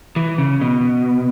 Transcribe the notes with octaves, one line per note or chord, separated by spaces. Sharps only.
E3
C#3
B2